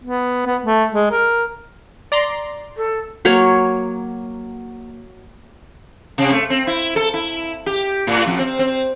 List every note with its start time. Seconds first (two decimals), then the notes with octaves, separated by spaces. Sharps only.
0.04 B3
0.46 B3
0.63 A3
0.93 G#3
1.11 A#4
2.12 D5 A#5 C6
2.77 A4
3.25 F#3 A#3 C#5
6.18 C3
6.32 A3
6.50 C4
6.67 E4
6.96 A4
7.14 E4
7.66 G4
8.07 A2
8.26 F2
8.39 C4
8.59 C4